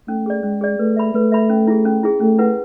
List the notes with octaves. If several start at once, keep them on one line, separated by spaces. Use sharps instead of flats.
A3 C#4
G#4 D5
G#3 C#4
G#4 D5
A3 B4
E5 B5
A3 B4
E5 B5
C#4
E4 G#4
C#4
E4 G#4
A3 C#4
E4 B4 F#5